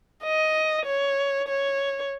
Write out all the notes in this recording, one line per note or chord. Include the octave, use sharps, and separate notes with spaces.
D#5
C#5
C#5